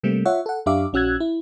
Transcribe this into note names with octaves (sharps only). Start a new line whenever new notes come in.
C3 G3 A3 A#3 C4
F4 C#5 E5 F#5
A4 F#5
F#2 D4 G4 E5 F5 D6
A#1 C#4 F#4 E6 F#6 G#6
E4